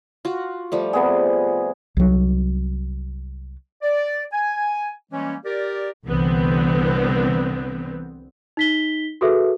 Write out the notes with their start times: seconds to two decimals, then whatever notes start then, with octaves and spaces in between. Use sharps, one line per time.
0.25 F4 F#4
0.72 F3 G3 A3
0.93 C3 B3 G#4
1.97 C2 F#3
3.82 D5
4.33 G#5
5.12 E3 G3 G#3 A#3 C#4
5.45 G4 A#4 D5
6.06 C2 D3 E3 B3 C4
8.57 D#4 B6 G7
9.21 F#4 G#4 A4 B4 E5